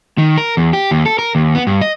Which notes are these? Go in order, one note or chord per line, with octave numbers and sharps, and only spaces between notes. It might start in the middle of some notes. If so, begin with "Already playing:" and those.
D#3
A#4
E2
G4
D#2
A4
A#4
D#2
B3
G2
D#5